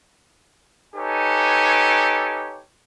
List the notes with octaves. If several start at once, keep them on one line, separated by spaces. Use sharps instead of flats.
D#4 G4 A4 B4 C#5 G#5